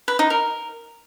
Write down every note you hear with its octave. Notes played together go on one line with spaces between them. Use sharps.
B4
D#4
A#4